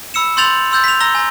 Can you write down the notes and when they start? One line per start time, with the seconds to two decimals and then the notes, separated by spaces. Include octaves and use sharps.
0.14 B5 E6 C#7 E7
0.37 C6 E6 G6 A6 F7 F#7
0.72 C6 E6 G6 A6
0.84 B6 F7
1.00 A#5 E6 A#6 G7
1.15 G#5 A#5